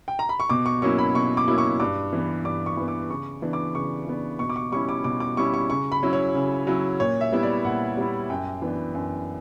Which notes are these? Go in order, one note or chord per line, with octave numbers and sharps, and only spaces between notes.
G5
A#5
B5
C#6
B2 D6
C#6
F#3 A#3 C#4 E4 C#6
B5
B2 C#6
D6
F#3 A#3 C#4 E4
C#6
G2 D6
E3 B3
G2 D6
C#6
E3 B3
D6
C#3 C#6
E3 B3 D4
D6
C#3 C#6
E3 B3 D4
B2 C#6
D6
C#6
G3 C#4 E4 C#6
D6
B2 D6
D6
G3 C#4 E4 C#6
C#6
C#3 C#6
B5
F#3 C#4 E4
C#5
C#3
F#3 C#4 E4
A#2 C#5
E5
G3 B3 E4
D5
A#2 F#5
G3 B3 E4
F#2 G5
E3 B3 D4
F#2